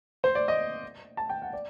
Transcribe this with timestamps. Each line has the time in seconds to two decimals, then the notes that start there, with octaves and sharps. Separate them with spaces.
0.24 C5
0.35 D5
0.48 D#5
1.17 A5
1.29 G5
1.42 F#5
1.53 D5